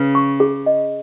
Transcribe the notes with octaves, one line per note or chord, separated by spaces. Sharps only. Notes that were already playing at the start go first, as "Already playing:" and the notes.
Already playing: C#3 B4
C#6
G#4
D#5